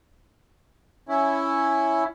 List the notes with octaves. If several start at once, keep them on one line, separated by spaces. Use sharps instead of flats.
C#4 E4